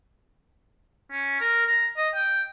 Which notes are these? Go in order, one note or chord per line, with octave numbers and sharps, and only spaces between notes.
C#4
A#4
A#5
D#5
G5